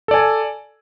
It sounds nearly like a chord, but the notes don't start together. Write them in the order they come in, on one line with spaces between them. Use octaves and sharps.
A4 D5 G#5